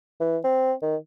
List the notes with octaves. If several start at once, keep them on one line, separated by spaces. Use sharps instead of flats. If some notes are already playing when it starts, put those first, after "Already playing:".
E3
C4
D#3